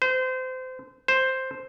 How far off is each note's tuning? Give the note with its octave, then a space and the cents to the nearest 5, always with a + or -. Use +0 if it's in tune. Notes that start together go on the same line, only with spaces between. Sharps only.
C5 -30
C5 +0